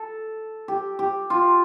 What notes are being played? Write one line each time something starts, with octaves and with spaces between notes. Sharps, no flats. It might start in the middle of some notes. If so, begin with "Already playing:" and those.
Already playing: A4
G4
G4
F4